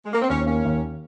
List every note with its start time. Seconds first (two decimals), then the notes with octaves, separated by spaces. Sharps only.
0.06 G#3
0.13 A#3
0.21 C4
0.29 D#2 C#4
0.46 A#3 C#4
0.65 D#2